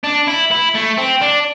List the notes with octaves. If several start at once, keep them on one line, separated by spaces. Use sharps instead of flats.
D4
E4
E4
A3
C4
D4